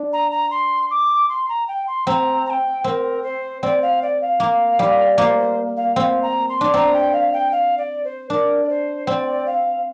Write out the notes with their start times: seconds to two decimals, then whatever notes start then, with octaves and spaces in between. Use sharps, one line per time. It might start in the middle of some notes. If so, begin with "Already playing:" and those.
Already playing: D4
0.13 A#5
0.31 A#5
0.51 C6
0.90 D6
1.29 C6
1.49 A#5
1.68 G5
1.87 C6
2.07 C4 A#5
2.45 A#5
2.50 G5
2.84 C4 A#4
3.23 C5
3.62 C4 D5
3.82 F5
4.02 D5
4.21 F5
4.40 A#3
4.79 G3
5.18 A#3 C5
5.38 C5
5.77 F5
5.96 C4 F5
6.22 A#5
6.49 C6
6.61 D4
6.74 C4 A#5
6.93 G5
7.13 F5
7.33 G5
7.52 F5
7.78 D5
8.04 C5
8.30 D4 A#4
8.64 D5
8.69 C5
9.07 C4 D5
9.46 F5